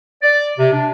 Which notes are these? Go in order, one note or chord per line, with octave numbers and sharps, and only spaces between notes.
D5
C3
D4